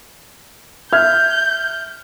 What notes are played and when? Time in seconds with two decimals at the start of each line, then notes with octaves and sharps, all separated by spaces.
0.93 E5 F6 G6 G#6